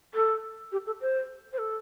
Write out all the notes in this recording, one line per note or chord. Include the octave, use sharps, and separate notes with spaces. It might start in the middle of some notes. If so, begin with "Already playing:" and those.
A4
G4
A4
C5
C5
A4